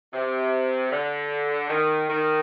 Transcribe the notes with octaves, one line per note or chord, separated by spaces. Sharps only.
C3
D3
D#3
D#3